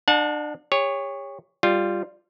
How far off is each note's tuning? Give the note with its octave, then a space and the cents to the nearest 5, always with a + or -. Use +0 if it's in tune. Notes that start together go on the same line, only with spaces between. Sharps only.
D4 +35 F#5 -35 A5 -15
G4 +45 C#5 +0
G3 +0 F4 +0